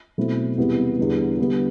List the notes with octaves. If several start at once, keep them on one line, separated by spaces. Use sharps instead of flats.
B2 F#3 A3 C4 E4
E2 C3 G3 B3 E4
E2 D3 G3 B3
D3 G3 B3 E4